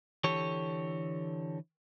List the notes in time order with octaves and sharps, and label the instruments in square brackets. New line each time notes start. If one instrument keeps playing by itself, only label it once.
[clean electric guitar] D3 E3 G4 A4 C#5